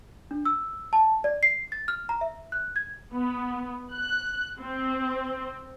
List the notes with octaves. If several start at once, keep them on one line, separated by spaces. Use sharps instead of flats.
D4
E6
A5
D5
C7
A6
F6
A#5
E5
F#6
G#6
B3
F#6
C4